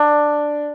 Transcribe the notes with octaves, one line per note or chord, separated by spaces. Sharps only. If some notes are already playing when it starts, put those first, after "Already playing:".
Already playing: D4